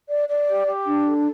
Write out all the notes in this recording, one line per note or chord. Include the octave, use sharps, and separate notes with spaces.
D5
D5
G4
G4
D4
A4